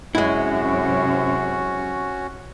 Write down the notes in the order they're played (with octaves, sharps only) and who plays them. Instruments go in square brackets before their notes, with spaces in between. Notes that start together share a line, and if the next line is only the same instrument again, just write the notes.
[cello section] F#2 C3 [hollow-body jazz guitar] G#3 E4 [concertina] C#4 F#4